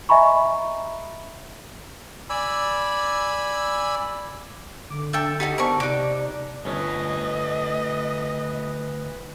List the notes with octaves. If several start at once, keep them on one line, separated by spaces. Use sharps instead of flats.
D#5 E5 G#5 A#5 B5 C#6
D5 G#5 B5 E6
D3 D6
D4 E5 G5 A5 G6 A6 C#7
D#4 F#4 G4 D#5 B6
B3 A#4 C5 D5 G#5 A5 C#6
C3 D#4 G4 D5 D6 F#6 D7
G1 D2 C#4 A4 B4 D#5